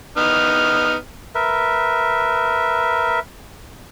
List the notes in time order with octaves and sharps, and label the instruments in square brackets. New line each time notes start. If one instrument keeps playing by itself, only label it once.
[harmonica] B3 D#4 F6
[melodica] A#4 B4 E5